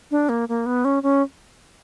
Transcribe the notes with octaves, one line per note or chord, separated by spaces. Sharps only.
D4
A#3
A#3
B3
C#4
C#4